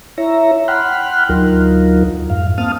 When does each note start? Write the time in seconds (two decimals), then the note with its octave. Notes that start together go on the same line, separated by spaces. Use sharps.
0.18 E4 C#5 E5 A#5
0.68 F#5 G5 B5 C6 F6 F#6
1.29 D2 F#3 D#4 F4 A#4
2.30 F2 G#2 F5
2.58 A#3 C4 F5 A5 D#6 F6